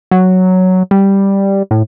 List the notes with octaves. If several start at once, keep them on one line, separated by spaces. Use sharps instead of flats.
F#3
G3
A2